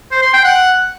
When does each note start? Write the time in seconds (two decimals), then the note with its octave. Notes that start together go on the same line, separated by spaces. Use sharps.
0.11 C5
0.22 C6
0.33 G5
0.44 F#5